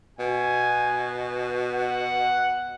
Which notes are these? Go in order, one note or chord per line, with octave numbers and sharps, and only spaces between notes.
B2 G#5
F#5